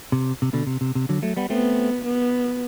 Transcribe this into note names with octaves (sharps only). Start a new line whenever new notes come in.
C3
C3
B2 D3
C3
C3
C3
D3 F#3
F#3 A3
G3 B3
A3 B3 C4
B3